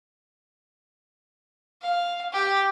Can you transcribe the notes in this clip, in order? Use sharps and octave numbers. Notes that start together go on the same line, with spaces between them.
F5
G4